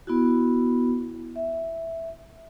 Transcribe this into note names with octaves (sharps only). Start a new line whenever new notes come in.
B3 E4 F#4
E5